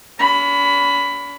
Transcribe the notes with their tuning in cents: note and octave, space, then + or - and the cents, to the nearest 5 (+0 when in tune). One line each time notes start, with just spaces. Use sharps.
C#4 +45 B5 +10